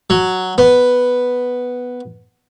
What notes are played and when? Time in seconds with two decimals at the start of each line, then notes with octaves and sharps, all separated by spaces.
0.10 F#3
0.58 B3